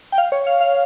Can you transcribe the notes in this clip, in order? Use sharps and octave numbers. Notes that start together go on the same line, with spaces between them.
G5
F5
C#5
F5
F5